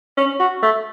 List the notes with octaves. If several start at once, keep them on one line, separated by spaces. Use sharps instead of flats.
C#4
F#4
A3